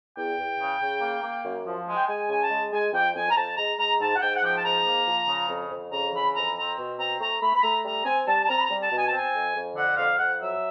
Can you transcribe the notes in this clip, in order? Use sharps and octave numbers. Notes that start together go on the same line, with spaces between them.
E2 G5
E2
C#3
C#3
A#3
A#3
F#2
F3
G#3
G5
G#3 G#5
C#3 G#5
A5
G#3
G#3 G#5
F2 G5
F2 G#5
A#5
F2 A5
G#3 A#5
G#3 A#5
G#2 A5
F#5
G#2 G5
F#5
F3 G5
A5
G#2 A#5
A#3
F3
C#3
F2
F2
C#3 A#5
E3 B5
F2 A#5
C4 A#5
B2
C4 A#5
A3 A#5
A3 B5
B5
A3 A#5
G3 A#5
C4 G#5
G3 A5
A5
C4 A#5
B5
A#5
G3
A5
B2
G#5
A5
C4
G#5
F2
F2
D3 F#5
F2 F5
F2 F#5
F#3 E5